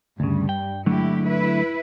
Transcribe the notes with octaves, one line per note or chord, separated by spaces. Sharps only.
D2 G2 C#3 G3
G5
D3 F#3 G#3 A3 E4 G4
E4 B4